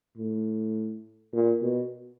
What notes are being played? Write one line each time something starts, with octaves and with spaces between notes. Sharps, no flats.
A2
A#2
B2